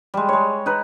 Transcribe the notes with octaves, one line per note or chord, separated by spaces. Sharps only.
G3 G#3
G#3 C#5
D#4 B4